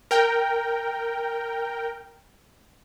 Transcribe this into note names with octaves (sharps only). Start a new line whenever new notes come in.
A#4 G5